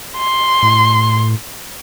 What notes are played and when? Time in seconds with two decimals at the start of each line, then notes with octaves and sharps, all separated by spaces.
0.17 C6
0.63 A2